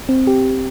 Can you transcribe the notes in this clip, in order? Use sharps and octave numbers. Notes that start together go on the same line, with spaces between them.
C4
G4